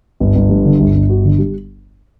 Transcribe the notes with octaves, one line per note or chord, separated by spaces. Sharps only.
G1
G1
G2
D3
G1
G1
F#4
D3
G3